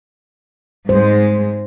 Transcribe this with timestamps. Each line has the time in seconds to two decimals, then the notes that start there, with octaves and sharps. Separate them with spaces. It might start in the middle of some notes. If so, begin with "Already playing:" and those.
0.89 G#2 G#3 C5